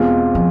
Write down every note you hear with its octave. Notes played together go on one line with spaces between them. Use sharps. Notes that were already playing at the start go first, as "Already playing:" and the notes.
Already playing: E2 B2 G#3 C4 F4
F3